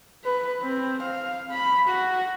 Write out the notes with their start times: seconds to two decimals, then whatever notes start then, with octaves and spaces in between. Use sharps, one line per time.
0.25 B4
0.62 C4
1.02 F5
1.51 B5
1.88 F#4